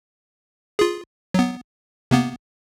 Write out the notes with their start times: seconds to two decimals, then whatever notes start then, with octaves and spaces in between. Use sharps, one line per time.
0.79 F4 G#4
1.34 F#3 B3
2.11 C3 A#3 B3